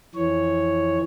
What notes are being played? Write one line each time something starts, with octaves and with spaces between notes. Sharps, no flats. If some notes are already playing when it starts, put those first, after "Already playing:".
F2 E3 C#5